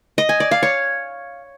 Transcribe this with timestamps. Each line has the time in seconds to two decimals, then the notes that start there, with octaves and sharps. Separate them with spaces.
0.18 D#5
0.29 G#5
0.40 D5
0.51 F5
0.63 C#5